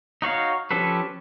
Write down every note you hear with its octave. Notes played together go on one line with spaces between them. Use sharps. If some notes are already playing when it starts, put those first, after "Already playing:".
D#4 F#4 C#5 F5
F3 C#4 G4 A4 B4